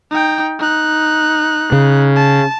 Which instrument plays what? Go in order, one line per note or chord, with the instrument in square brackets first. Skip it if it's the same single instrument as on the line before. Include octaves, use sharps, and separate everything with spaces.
[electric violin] D#4 G5
D#4 F#6
[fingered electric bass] C#3
[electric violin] A5